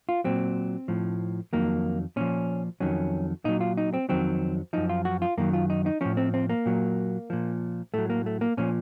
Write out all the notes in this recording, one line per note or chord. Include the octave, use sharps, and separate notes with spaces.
F4
A#2 F#3 C4
A2 F3
F2 D#3 F#3 A#3
A#2 F3 C#4
F2 D#3 F#3 C#4
A#2 F#3 D#4
F4
D#4
C4
F2 D#3 F#3 C4
F#2 F3 D#4
F4
F#4
F4
F#2 D#3 F#3 A#3
F4
D#4
D#4
A2 F3 C#4
C4
C4
A#3
A#2 F#3
A#2 F3
A2 F#3 A3
A#3
A3
A#3
A#2 F3 C#4